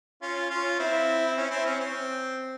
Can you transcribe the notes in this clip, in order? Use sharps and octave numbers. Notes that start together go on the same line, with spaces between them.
C#4 F4
C#4 F4
C4 E4
E4
C#4
C4 E4
C#4
C4